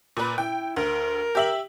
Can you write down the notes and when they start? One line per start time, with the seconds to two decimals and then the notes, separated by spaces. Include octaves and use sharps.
0.17 A#2 B4
0.38 E4 G5
0.76 D2 A#4
1.35 G4 E5 F#7